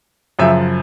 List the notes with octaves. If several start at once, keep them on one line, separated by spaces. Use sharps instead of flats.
F#2 C#3 F3 E5